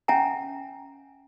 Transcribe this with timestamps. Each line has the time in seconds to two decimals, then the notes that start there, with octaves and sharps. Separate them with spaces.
0.08 C#4 E5 F#5 G#5 A#5